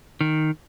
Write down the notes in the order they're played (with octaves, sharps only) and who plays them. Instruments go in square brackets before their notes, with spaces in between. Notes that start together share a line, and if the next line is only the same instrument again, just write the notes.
[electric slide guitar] D#3